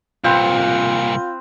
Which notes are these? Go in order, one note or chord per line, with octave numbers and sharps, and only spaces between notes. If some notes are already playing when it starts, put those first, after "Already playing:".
C2 A#2 C4 F4 B4